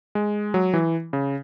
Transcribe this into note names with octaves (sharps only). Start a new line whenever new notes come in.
G#3
F#3
E3
C#3